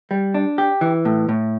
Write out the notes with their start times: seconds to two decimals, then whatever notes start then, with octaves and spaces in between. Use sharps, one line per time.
0.11 G3
0.34 D4
0.58 G4
0.81 E3
1.05 A2
1.29 A2